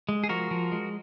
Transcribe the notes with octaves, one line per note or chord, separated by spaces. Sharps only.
G#3
G#4
F3 F#4 A#4
F3
G#3